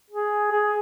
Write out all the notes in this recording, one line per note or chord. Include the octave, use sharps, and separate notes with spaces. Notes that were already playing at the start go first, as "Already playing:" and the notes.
G#4
G#4